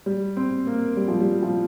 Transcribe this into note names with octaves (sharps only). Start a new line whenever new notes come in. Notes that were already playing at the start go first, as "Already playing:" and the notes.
G3
C4
A#3
G3
F3
G3
F3